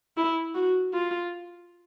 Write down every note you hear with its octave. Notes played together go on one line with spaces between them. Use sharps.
E4
F#4
F4